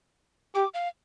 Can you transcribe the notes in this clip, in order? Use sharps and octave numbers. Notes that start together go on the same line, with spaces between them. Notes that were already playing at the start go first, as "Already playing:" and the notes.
G4 D6
F5